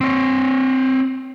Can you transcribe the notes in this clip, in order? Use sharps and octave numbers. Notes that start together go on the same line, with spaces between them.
C4 C#5